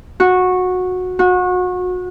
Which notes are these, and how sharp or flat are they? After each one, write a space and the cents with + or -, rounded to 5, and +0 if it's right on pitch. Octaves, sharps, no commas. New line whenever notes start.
F#4 -15
F#4 -30